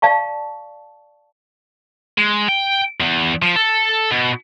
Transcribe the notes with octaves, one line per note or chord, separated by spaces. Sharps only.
D5 F5 A5 C#6
G#3
G5
E2
F3
A4
B2